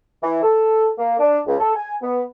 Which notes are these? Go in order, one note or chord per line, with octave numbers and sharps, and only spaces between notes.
E3
A4
A#3
D4
C#2
A4
G#5
B3